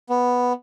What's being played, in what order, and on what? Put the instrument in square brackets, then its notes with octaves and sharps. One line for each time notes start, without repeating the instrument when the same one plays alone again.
[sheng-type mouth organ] B3